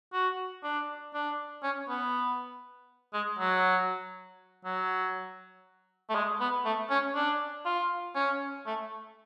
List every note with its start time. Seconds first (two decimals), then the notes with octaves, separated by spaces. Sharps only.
0.13 F#4
0.64 D4
1.14 D4
1.63 C#4
1.89 B3
3.13 G#3
3.39 F#3
4.65 F#3
6.10 A3
6.15 G#3
6.40 B3
6.65 A3
6.90 C#4
7.15 D4
7.65 F4
8.15 C#4
8.66 A3